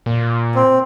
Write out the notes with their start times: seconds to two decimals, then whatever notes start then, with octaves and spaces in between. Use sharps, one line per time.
0.06 A#2
0.55 C4